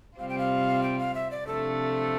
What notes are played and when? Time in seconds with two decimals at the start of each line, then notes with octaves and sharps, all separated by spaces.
0.19 C3 G3 C4 F4 F5
0.29 G5
0.38 F5
0.83 G5
0.99 F5
1.15 E5
1.31 D5
1.47 C3 F3 A3 D4 A4